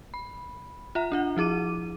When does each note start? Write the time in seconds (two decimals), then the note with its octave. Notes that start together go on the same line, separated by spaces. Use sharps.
0.14 B5
0.95 F4 E5 A#5
1.12 D4 F4 F#5
1.37 F3 E4 G#4 D6 D#7